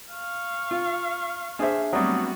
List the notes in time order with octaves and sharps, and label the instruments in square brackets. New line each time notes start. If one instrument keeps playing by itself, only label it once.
[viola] F5 C#6
[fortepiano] F4
[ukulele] D4 E5 [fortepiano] G#4 C5
[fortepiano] F#3 G3 [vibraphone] A3 C4 D#6 [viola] B3 F#4